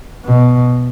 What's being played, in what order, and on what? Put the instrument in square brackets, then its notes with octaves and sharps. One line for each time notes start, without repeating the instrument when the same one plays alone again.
[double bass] B2